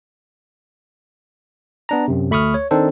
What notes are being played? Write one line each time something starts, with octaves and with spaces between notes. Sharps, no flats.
B3 D4 A#5
F#2 C3
D2 A3 B5 C#6 D#6 F6
C#5
D#3 C4 D4 D#4 A4 C5